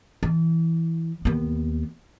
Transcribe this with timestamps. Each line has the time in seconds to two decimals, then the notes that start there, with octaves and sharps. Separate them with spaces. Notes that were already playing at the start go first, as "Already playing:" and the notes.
0.23 E3
1.25 D#2 B3